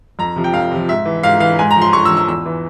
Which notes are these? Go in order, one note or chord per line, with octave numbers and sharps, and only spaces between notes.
F2 A#5
C3 F3
G5
F2 F5
C3 F3
G#2 E5
E3
G#2 F5
E3 F5
G#2 G#5
A#5
F3
C6
G#2 C#6
E6
F3
E6
E2 E6
E3